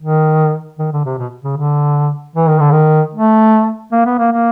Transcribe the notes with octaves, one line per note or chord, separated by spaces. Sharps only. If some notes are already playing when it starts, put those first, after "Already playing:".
D#3
D#3
D3
C3
B2
C#3
D3
E3
D#3
D3
D#3
A3
A#3
B3
A#3
A#3